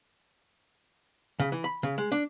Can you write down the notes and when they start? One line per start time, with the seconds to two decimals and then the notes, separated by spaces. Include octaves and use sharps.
1.40 C#3
1.52 E3
1.64 B5
1.83 C#3
1.98 G#3
2.12 D4